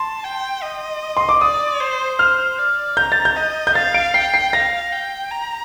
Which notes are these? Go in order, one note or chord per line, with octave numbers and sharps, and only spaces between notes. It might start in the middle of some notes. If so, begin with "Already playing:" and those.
Already playing: A5 C6
G5
D#5
C6
D6
D5 D#6
C5
C5 F6
D5
A#5 G6
A6
G6
D#5
G6
F5 A6
D7
G5 C7
C7
F5 A#6
G5
A#5